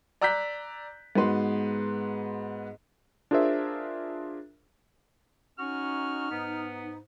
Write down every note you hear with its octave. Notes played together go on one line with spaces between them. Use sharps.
D5 A#5 E6 F#6 G6 B6
G#2 B3 F#4 B4 C6
D4 F4 G#4 A#4 C5 E5
C#4 D#4 F#4 F6
G#2 B3